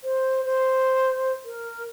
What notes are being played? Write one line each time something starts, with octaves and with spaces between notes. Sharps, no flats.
C5
C5
A#4